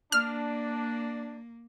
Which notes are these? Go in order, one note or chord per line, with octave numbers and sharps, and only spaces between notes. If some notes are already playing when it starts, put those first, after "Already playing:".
A#3 D4 F6